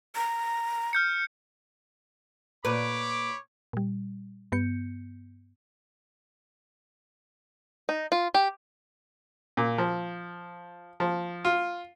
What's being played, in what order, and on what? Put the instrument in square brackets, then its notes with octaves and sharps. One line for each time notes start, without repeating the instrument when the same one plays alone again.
[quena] A#5
[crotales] F6 G6 C#7
[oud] A#2 B4 [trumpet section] C#5 B5 D6
[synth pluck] A#2 G3
G2 B3 G6 C#7
[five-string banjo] D#4
F4
G4
[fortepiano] A#2
F3
F3
F4